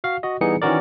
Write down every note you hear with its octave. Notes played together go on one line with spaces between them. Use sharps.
F#4 F5
F#4 D#5
E3 G3 B3 D#4 G#4 C#7
D#3 E3 C#4 F#4 A#4 D5